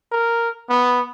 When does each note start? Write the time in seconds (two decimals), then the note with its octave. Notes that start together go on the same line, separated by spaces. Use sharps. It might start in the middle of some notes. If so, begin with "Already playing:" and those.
0.12 A#4
0.70 B3